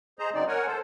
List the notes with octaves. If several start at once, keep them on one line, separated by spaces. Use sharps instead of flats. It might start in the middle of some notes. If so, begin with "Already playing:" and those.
G#4 C5 D#5 A#5
C#3 F#3 C4 D#4 D5
A#4 C#5 F#5 G#5
A4 C5